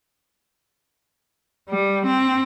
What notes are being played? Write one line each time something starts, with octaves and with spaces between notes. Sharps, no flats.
G3
C4